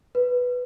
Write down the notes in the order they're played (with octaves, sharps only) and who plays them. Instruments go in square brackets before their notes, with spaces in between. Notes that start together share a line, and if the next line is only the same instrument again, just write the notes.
[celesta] B4